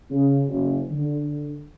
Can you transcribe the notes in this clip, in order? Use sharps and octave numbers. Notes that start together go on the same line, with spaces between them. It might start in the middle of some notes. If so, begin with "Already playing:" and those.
C#3
F#1
D3